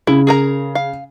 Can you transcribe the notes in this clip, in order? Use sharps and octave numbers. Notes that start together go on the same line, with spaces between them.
C#3 E4
G#4 A#4 A#5
F5